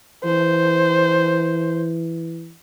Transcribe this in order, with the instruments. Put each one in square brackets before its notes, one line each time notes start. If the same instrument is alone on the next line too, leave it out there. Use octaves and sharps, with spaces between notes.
[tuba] E3 [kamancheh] C5